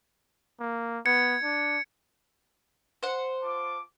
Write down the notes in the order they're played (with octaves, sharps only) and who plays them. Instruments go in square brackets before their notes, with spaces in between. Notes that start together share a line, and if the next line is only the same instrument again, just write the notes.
[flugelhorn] A#3
[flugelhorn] B3 [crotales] G#6 C#7
[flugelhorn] D4
[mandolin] C5 F#5
[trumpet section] F4 A5 D6